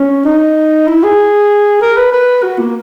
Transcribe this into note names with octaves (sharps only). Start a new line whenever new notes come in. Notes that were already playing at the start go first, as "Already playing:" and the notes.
Already playing: C#4
D#4
E4
G#4
A#4
B4
B4
F#4
A#3